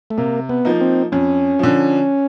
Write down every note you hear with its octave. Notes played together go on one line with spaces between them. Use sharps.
A3
C3 A#3
B3
F3 A#3 D#4
C4
F2 C#4
D3 F3